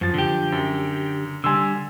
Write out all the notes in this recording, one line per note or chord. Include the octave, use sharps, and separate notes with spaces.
F#2 F3 A6
D3 G4
F#2
D3 G3 G#5 C6 E6